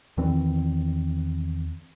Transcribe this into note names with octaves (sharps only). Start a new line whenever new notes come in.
E2 D#3 E3 C4